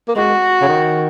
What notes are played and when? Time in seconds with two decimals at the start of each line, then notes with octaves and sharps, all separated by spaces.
0.08 A#3
0.16 G#3 F#4
0.62 C#3
0.68 D#3